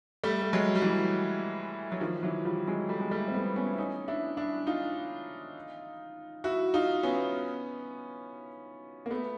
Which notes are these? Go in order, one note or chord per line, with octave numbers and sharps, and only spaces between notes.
G3 A3
A3
F#3 G#3
G3
E3 F#3
F#3
D#3 F3
E3 F#3
F3 G3
F#3 G#3
G3 A3
G#3
G3 A3
C4
A3 B3
B3 C#4
E4
C#4 D#4
D4 E4
D4 E4
D#4 F4
E4 F#4
D#4 F4
B3 C#4
A#3
A3 B3